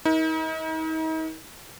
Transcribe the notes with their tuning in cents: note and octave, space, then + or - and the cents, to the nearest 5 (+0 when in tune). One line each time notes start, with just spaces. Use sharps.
D#4 +40 A#4 +35